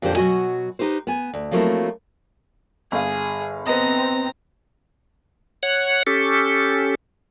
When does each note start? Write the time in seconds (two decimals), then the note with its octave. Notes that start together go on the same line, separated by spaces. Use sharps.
0.02 F2 A#2 D3 G4 C5
0.15 B2 F#3 C4 F#4 D#5 G#5
0.79 D#4 G4 B4 C5
1.07 B3 G#5
1.33 D2
1.51 F3 F#3 A3 A#3 C4 E4
2.92 G1 G#4 F5
3.66 B3 C4 D#5 A#5
5.63 C#5 F#5 F#6
6.07 C#4 G4 A4